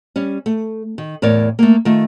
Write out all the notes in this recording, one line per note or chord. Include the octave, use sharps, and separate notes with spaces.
G3 C#4
A3
D#3
E2 A2 A#4 C#5 D5
A3 A#3
D#3 A3 F4